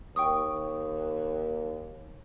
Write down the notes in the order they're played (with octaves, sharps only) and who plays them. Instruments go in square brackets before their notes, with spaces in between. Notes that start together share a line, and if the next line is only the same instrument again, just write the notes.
[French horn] D#2 [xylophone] G5 C#6 D#6